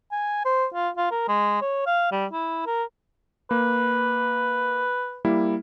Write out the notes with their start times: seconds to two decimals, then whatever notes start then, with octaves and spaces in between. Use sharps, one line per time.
0.12 G#5
0.45 C5
0.74 F4
0.97 F4
1.11 A#4
1.28 G#3
1.61 C#5
1.86 F5
2.12 G3
2.32 E4
2.66 A#4
3.51 A#3 B4
5.25 G3 A#3 E4